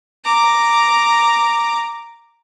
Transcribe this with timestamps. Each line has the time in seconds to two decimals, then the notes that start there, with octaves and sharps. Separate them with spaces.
0.25 A#5 D6